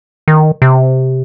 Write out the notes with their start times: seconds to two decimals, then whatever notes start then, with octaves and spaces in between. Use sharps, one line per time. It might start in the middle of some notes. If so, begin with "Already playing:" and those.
0.28 D#3
0.62 C3